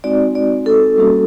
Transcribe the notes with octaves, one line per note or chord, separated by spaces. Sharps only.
G#3 C4 D#4 F#4 D5
D5
A4
G3 A#3 C#4 F#4